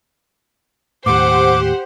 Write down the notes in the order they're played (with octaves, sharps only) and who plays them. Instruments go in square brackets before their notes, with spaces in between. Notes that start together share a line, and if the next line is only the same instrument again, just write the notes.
[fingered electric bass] D#2 A2 [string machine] G4 [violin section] C5 F#5 [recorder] D6